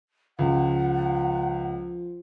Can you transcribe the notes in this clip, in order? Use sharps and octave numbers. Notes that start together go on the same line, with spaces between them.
C#2 F3 F#5